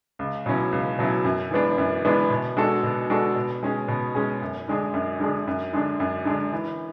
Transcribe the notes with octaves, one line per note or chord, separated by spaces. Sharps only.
C#2
B2 F#3 C#4 E4
C#2
B2 F#3 C#4 E4
F#2
E3 G#3 B3 D4
F#2
E3 G#3 B3 D4
B2
G#3 D4 F#4 A4
B2
G#3 D4 F#4 A4
B2
G#3 C#4 G#4
B2
G#3 C#4 G#4
F#2
D3 G#3 D4 G#4
F#2
D3 G#3 D4 G#4
F#2
D3 G#3 D4
F#2
D3 G#3 D4
E3